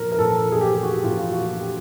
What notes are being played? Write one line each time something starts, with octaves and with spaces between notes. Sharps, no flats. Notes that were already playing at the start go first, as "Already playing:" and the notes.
Already playing: A#2 F3 A#4
A#4
A#2 F3 A4
G#4
G4
F#4
A#2 F3 F4
F#4
G4